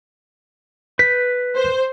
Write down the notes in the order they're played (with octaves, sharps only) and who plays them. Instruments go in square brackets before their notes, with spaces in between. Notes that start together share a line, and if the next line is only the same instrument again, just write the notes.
[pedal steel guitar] B4 G6 [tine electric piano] B6
[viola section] C5